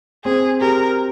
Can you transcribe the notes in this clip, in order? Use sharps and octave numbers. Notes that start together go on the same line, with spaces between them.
C4 G#4
G4 A#4